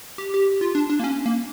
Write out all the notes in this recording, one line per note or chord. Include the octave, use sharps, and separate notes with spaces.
G4
G4
F4
D4
D4
A#3
C#4
A#3